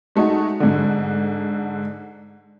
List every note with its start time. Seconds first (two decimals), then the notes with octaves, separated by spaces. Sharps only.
0.16 G#3 A3 D#4 F#4
0.60 G#2 D3